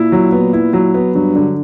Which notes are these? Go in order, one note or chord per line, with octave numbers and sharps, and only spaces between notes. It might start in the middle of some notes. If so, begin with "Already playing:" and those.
Already playing: A#2 E4
F#3
B3
E4
F#3
B3
G2 F#3
D3